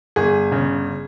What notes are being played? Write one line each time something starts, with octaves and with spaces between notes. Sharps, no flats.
G1 G#4
C#3